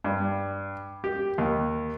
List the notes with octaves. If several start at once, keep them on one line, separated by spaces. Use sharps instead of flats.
G2
G4
D#2